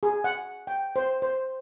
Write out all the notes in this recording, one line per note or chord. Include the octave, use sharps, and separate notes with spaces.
G#4
F#5
G5
C5
C5